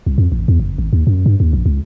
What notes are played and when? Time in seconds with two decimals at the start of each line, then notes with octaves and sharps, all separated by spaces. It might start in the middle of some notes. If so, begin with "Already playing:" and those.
0.06 C2
0.18 F2
0.32 A1
0.48 E2
0.60 F#1
0.78 G#1
0.93 D#2
1.07 F#2
1.26 G2
1.40 D#2
1.53 A#1
1.66 C#2